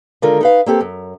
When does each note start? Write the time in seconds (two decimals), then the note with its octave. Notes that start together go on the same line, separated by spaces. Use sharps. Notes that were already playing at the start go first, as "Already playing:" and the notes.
0.22 D3 D#3 G#3 F4 A#4
0.41 D#4 B4 F5
0.66 A#3 C4 G4 A4
0.81 F#2